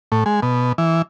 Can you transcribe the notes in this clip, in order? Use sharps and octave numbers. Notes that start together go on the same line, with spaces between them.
A2
G#3
B2
E3